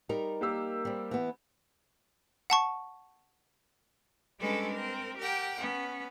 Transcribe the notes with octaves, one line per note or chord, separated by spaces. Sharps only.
G3 D#4 A#4
A#3 G4 E6
G3 C4
E3 B3
F#5 A5 C#6
G3 G#3 C#4 D4 A4 B4
C4 A#4
G4 A#4 F#5 G5
B3 C#4